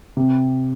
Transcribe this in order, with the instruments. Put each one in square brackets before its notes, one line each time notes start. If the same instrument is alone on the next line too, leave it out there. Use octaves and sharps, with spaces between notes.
[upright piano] C3